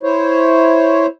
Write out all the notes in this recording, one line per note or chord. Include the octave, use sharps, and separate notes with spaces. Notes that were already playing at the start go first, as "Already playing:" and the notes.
E4 C5 C#5